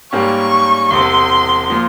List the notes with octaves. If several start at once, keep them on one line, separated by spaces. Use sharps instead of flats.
G#2 G3 A#3 C#4 G4 C#6
E1 E2 C3 C6
A#2 F3